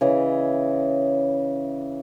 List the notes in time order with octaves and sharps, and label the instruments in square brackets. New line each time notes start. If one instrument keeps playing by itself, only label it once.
[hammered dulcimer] C#3 E3 D#5